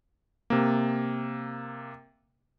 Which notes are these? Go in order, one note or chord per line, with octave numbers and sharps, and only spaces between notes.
C3 A#3